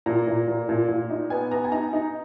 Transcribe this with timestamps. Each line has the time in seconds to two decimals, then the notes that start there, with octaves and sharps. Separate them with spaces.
0.06 A#2 A#5
0.27 A#2
0.48 A#2
0.69 A#2
0.88 A#2
1.10 D#4
1.30 B3 G#5
1.51 B3 A#5
1.64 G#5
1.72 D#4 A#5
1.93 D#4